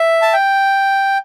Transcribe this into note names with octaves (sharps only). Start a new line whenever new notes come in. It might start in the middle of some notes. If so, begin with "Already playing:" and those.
Already playing: E5
A5
G5